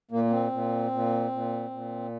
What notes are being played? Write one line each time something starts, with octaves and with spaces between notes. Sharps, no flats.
A#2 A#3
A#3
C4
A#2
A#2
A#2
A#2